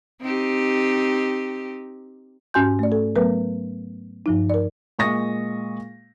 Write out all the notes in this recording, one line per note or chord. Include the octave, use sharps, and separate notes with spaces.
C4 D#4 G4
G#2 C#4 F#4 G#5 C6 G6
A3 D5
A4
F#3 A3 B3 A#4 B4
G2 F3 D#4
A#4 D5
A#2 G#3 C#6 D#6 A#6